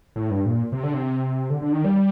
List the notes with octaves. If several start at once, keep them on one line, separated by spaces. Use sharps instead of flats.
A2
G2
A#2
C3
D3
C3
D3
D3
D#3
G3